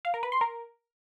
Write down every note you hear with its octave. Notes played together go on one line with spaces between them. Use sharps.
F5
A#4
B4
C6
A#4